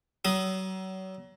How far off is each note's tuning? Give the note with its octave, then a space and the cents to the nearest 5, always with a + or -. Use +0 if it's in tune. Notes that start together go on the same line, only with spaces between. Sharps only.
F#3 +35 D#6 +0